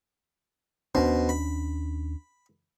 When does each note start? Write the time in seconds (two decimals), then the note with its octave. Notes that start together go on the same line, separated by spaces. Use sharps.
0.95 D#2 B2 C#4 D4 C5
1.29 B5